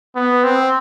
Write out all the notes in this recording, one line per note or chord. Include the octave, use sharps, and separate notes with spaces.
B3
C4